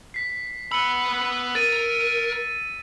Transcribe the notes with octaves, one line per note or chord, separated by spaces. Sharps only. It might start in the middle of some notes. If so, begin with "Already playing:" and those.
B6 C7
B3 B5 E6 C#7
A#4 A6 D#7